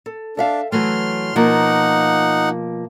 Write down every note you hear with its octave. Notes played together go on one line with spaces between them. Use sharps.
A4
D4 A4 E5 F5
E3 F#3 A3 C6 F6
B2 F3 A#3 D#4 F#5